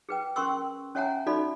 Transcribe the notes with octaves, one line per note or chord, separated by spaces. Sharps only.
G#4 B4 G5
C#4 A#4 G5 C6 C#6 E6
C#4 C#5 E5 F#5 G#5 A#5
D#4 F#4 A4 D5 E5 B5